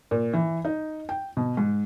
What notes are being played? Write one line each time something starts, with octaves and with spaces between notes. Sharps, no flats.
A#2
E3
D#4
G5
B2
G#2